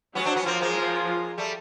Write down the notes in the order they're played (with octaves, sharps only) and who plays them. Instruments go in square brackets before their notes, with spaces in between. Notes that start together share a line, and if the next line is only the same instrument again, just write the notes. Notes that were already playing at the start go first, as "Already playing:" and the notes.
[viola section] F#3 F#4 [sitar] B3 C#4
[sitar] C4 D4
B3 C#4
[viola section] F3 F4 [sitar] A#3 C4
[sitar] G#3 A#3
[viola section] F3 F4
[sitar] G3 A3